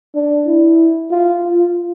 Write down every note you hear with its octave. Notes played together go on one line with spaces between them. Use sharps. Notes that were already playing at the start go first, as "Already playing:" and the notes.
D4
E4
F4
F4